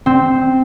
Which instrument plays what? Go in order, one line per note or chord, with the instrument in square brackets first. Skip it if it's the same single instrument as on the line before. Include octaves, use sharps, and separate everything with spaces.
[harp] C4